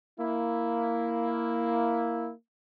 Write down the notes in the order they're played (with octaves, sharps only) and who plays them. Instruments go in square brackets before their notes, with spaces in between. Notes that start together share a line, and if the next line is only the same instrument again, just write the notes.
[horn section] A#3 E4